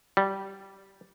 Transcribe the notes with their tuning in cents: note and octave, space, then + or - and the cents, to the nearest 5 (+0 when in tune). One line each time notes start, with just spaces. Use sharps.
G3 -15